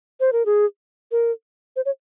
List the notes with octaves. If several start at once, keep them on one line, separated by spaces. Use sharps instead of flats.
C5
A#4
G#4
A#4
C5
C#5